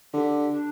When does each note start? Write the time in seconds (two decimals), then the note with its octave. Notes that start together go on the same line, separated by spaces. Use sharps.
0.14 D3 G4
0.52 D4